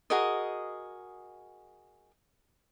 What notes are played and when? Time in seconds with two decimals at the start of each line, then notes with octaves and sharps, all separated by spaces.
0.10 F#4 G#4 A#4 D#5